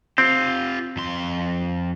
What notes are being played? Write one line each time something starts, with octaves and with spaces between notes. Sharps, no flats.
C4 F4 G4
F2 C6